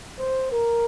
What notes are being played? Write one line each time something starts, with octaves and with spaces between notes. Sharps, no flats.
C5
A#4